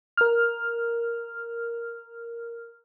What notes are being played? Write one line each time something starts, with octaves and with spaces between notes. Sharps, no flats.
A#4 F6